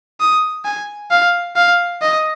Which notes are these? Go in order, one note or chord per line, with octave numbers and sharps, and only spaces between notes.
D#6
G#5
F5
F5
D#5